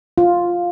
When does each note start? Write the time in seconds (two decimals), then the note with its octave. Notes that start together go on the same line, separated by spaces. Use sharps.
0.18 F4